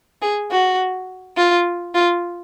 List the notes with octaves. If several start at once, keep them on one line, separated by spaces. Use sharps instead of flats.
G#4
F#4
F4
F4